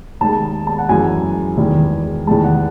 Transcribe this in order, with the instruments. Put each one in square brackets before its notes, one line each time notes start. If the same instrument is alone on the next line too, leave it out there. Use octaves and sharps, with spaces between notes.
[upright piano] D#2 D#3 G#3 A5
A5
F#5
F#2 E3 G#3 G#5
E2 D#3 G#3
E2 D#3 G#3 A5
F#5